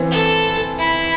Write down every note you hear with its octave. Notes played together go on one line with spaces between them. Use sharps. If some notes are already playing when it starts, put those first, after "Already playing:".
Already playing: E3 C4
A4
E4